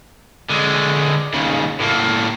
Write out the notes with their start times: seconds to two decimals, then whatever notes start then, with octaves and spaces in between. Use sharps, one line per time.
0.50 D3 G#3
1.33 D#2 C#3
1.80 A2 A#3